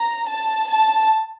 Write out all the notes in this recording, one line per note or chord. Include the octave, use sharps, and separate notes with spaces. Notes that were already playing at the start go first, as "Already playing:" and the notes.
Already playing: A#5
A5
A5